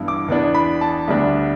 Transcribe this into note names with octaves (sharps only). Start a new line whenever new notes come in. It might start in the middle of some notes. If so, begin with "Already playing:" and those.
Already playing: G2 E3 B3 E4
D6
E2 E3 B3 D4
B5
A5
D2 D3 G3 B3 D4